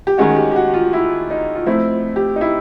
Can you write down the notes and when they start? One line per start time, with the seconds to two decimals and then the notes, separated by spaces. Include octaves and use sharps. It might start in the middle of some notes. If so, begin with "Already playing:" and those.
0.07 G4
0.18 D#3 G#3 C#4 F#4
0.36 G4
0.52 G4
0.56 F#4
0.74 F4
0.93 E4
1.30 D#4
1.55 F4
1.66 F3 A3 C4 E4
2.16 G4
2.36 D#4
2.41 E4